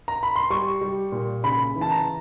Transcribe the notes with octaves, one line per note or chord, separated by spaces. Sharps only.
A#5
B5
C6
G3 C#6
G3
A#2
C#3 B5
E3
A5
A#5